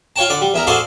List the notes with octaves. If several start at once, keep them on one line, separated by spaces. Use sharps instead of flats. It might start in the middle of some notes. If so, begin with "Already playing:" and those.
F4 C#5 G5 A5
D3 D5
G3
E2 E4 A#4
F#4 G#4 A4 C5 D5 F5